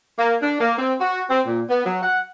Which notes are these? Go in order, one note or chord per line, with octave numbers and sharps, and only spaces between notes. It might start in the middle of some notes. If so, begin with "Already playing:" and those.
A#3
D4
A#3
C4
F#4
C4
A#2
B3
F#3
F#5